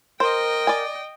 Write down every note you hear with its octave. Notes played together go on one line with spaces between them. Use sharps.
A#4 C5 D#5 G5
D5 G#5